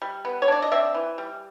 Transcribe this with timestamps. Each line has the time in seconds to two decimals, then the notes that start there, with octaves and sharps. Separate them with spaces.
0.02 G3
0.25 B3
0.42 C#5
0.48 D4 D5
0.62 D#5
0.71 C4 D5 E5
0.94 E3
1.18 G3